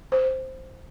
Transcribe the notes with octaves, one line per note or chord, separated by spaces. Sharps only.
C5